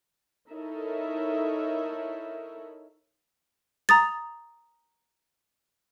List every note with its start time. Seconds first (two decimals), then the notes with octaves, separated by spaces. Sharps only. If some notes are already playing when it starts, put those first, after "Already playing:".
0.50 D#4 E4 A4 A#4 C#5 E5
3.89 A#5 D#6 A6